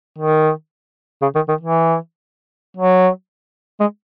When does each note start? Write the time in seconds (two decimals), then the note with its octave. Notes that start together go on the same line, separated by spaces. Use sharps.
0.19 D#3
1.22 C#3
1.35 D#3
1.48 D#3
1.61 E3
2.77 F#3
3.80 G#3